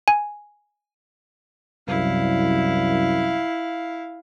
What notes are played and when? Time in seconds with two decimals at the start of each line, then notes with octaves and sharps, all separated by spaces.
0.08 G#5
1.88 C2 F#2 E4 F5